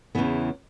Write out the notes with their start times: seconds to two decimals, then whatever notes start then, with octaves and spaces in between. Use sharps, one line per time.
0.15 E2 C#3 E3 B3